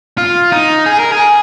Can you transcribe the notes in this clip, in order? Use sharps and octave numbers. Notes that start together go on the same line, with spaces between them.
F4
D#4
G#4
A#4
G#4